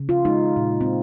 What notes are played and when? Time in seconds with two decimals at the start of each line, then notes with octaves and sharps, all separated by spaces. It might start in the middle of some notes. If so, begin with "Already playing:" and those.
Already playing: C#3
0.09 F4
0.25 G#3 D#4
0.56 A#2
0.81 C4